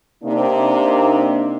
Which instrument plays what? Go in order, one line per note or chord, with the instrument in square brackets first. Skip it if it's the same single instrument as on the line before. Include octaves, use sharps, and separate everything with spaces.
[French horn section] C3 D#4 [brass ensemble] A#3 D4